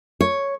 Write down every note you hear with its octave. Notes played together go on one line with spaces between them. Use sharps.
C#5